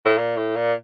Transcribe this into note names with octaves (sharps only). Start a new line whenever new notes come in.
A2
A#2
A2
A#2